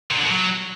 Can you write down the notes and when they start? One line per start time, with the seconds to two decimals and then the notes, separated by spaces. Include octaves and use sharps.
0.11 A#2
0.17 D3
0.23 B2
0.29 F#3